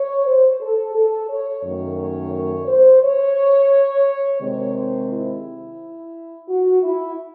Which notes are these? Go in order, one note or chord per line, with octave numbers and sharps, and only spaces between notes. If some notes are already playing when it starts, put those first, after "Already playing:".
Already playing: C#5
C5
A4
A4
C#5
F#2 D#3 A3 C#5
C#5
C#5
C5
C#5
C3 D#3 G#3 C4 C#5
C5
E4
F#4
E4